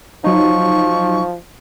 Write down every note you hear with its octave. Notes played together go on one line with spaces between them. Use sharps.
F3 F#3 D#4 C#6